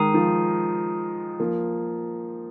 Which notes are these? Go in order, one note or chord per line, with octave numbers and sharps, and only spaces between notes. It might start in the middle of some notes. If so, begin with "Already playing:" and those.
Already playing: D#3 G#3 A#5 D#6 C7 D#7
F3
F3 A#3